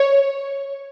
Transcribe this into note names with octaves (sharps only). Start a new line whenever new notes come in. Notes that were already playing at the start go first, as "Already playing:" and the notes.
Already playing: C#5